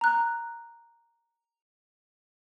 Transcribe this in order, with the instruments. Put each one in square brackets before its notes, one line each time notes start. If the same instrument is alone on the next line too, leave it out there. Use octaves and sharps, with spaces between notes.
[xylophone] A#5 F#6